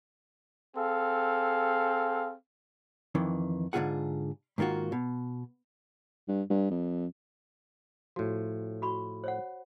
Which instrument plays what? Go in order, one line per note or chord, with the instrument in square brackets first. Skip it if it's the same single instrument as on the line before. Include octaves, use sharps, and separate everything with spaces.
[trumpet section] C4 G#4 A4 F5
[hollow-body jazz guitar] F2 D#3 E3
G#2 D3 D#3 F4 G#4 F#5
G#2 D#3 A#3 F4 F#4
B2
[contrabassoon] G2
G2
F2
[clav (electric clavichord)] A2 F3 [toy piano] F#4
[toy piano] F#4 B5 C#6
C5 C#5 F#5